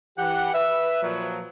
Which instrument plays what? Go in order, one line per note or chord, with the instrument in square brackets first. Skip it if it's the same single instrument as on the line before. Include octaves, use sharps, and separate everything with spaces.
[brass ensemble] E3 [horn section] G4 F#5
[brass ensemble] B4 [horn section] E5
[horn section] A#2 F3 F#3